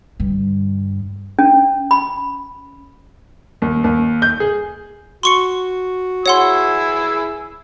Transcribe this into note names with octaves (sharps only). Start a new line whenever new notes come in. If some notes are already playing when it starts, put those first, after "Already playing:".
G2 D3
C#4
B5
D#2
D#2
G6
G#4
F#4 C6 C#6 C#7
E4 G#4 C#5 F#5 C6 E6